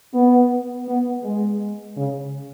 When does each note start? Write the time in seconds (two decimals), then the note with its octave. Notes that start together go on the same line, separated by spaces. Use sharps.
0.14 B3
0.87 B3
1.23 G#3
1.97 C#3